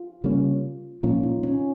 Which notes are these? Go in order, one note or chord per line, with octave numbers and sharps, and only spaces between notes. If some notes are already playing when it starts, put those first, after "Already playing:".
Already playing: F4
C#3 G3 A#3 C#4
A#2 F3 A#3 C#4 F4
D#4
C#4